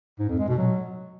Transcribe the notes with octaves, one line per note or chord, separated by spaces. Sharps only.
G#2
F2
G#3
B2
F#3